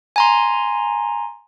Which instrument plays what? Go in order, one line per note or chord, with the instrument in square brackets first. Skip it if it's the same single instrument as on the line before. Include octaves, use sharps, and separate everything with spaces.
[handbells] G#5 A#5 C6